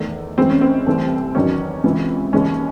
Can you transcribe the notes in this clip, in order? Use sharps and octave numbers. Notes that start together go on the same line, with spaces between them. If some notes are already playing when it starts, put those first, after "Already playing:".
Already playing: E2 D#3 A3
F#2 E3 G#3 C4
C#4
C4
C2 C3 E3 A3
E2 D#3 F#3 C#4
C#2 C3 E3
D#2 C#3 E3 G#3 C#4